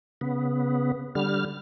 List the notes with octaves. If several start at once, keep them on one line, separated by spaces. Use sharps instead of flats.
C#3 B3
D3 G3 F6